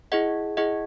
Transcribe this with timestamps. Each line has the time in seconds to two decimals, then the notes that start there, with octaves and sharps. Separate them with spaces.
0.12 E4 G#4 D#5 F#5
0.57 E4 G#4 D#5 F#5